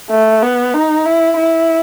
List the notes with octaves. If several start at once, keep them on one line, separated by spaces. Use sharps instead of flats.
A3
B3
D#4
E4
E4